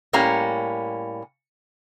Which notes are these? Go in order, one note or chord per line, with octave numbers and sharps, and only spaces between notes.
A2 G3 A#3 C#4 A#5